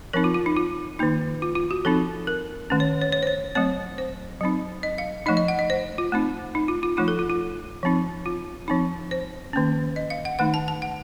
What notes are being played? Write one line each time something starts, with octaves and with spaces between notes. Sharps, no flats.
F3 C4 D#4 A#4
F4
F4
D#4
F4
D#3 A#3 D#4
F4
F4
F#4
F3 C4 D#4 A4
A#4
D#3 A3 C#4
C#5
C#5
C#5
C5
C#5
F#3 A3 C4 C#5
C5
F#3 C4 D#4
D#5
F5
F3 A3 D#4 D#5
D#5
F#5
D#5
C5
F4
A3 C4 D#4
D#4
F4
F4
F3 A3 D#4 F4
A4
F4
F4
F3 C4 D#4
F4
F3 C4 D#4
C5
D#3 A#3 C#4
D#5
F5
F#5
D#3 A3 D#4 F#5
A5
A5
F#5